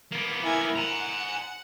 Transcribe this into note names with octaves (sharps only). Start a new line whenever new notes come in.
A#3 B3
E4 A#4 G#5
F#5 G#5 A#5